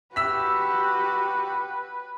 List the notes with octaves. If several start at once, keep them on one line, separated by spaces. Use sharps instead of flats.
F#4 G4 B4 E6 B6